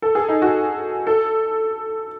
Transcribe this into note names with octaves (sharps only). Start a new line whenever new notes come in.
A4
G#4
D#4
F#4
A4